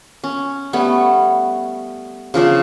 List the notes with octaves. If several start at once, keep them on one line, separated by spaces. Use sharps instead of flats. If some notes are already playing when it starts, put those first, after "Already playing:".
C#4
G3 A3 B3 C#4
C#3 F3 D4 C5